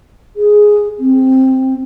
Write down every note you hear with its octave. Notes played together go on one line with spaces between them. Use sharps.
G#4
C4